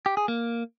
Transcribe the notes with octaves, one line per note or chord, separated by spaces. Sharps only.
G4
G#4
A#3